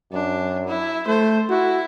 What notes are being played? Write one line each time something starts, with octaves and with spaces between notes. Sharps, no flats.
F#2 D4
E4
A3 C5
E4 F#4